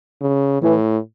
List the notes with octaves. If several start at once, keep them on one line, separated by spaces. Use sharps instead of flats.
C#3
A2 E3